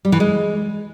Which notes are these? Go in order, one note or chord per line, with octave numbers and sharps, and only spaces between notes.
G3
E3
G#3